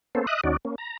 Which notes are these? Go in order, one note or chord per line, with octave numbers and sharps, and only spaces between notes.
A#3 B3 C#4 A4 C5
D#5 E5 D#6 F#6
D#2 C#4 D#4 F#4 D5
A#3 C#4
A#5